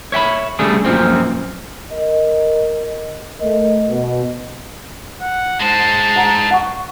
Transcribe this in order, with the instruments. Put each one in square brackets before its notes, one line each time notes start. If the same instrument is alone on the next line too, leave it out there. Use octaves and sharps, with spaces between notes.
[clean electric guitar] C#5 E5 G5 B5
C#3 G3 A3 D4 G#4
F#2 A#2 F3 C4
[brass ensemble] A#4 D#5
A3 A#4 D#5
B2
[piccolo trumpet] F#5
[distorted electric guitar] G#3 C5 [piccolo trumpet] A5
[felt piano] F#5 A#5
F#5 C#6